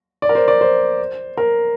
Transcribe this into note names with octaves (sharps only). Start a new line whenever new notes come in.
D5
A#4
C5
D5
C5
A#4